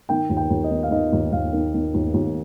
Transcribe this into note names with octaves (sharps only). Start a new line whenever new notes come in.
D#3 G5
D#2
G5
D#2
D#5
D#3
F5
D#3 D#5
D#2
D#2 F5
D#3
D#3
D#2
D#2